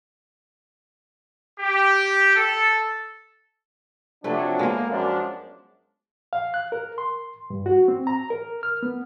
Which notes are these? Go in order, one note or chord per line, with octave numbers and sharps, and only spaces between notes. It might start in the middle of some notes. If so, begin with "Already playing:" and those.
G4
A4
C3 F3 F#3 A3 D4 B4
G#3 A#3 B3
F#2 F3 D4
F5
F#6
A#4
C6
G2
F#4
C4
A#5
A#4
F6
B3